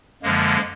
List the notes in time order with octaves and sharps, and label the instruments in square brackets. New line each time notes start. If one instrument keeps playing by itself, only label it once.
[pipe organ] F#2 D3 F3 G#3 A#3